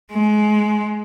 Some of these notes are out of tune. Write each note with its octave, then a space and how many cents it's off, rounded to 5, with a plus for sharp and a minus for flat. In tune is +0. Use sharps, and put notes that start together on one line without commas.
G#3 +25